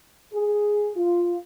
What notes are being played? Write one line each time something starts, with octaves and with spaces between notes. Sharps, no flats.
G#4
F4